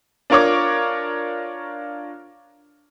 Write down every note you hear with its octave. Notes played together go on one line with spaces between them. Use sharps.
D4 F4 A#4 C#5 C#6 D6